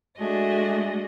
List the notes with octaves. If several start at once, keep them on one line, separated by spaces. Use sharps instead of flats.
G#3 A3 D4 F#4 G#4 D#5